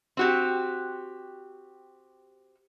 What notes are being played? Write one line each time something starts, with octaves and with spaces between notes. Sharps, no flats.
C4 F#4 G4